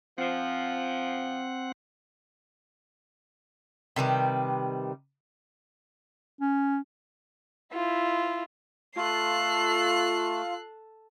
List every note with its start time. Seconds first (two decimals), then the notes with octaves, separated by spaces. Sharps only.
0.18 F3 C4 F#5
3.96 C3 D#3 G3 B4
6.41 C#4
7.73 E4 F4
8.96 A3 F4 A4 F#6 C7